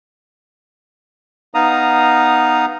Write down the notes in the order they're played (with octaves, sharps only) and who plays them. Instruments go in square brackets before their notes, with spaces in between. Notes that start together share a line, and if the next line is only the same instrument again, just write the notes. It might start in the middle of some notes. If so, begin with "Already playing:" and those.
[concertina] B3 D#4 F5 A#5 D#6